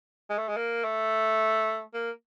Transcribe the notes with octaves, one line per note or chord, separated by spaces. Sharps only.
G#3
A3
G#3
A#3
A3
A#3